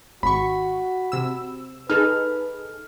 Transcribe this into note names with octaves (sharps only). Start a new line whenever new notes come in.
G#1 F#4 B5 C#6
C3 E6
D#4 G#4 A4 B4 F6